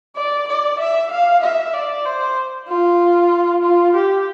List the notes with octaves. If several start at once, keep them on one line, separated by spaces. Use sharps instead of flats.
D5
D5
E5
F5
E5
D5
C5
F4
F4
G4